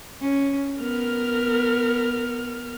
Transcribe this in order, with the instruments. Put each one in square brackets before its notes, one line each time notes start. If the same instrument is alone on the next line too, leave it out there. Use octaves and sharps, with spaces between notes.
[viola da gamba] C#4
[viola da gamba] B3 [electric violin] A#4 F6